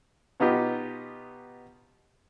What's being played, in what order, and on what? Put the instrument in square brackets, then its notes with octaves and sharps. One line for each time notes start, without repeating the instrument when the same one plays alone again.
[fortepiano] B2 B3 D#4 F4 G4